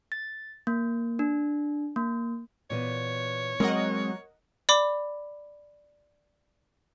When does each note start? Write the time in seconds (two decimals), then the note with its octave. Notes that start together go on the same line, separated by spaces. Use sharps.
0.12 A6
0.67 A#3
1.19 D4
1.96 A#3
2.70 A#2 E3 B3 C#5
3.60 F#3 G#3 A#3 C4 A#4 D#5 F#5
4.69 D5 B5 D6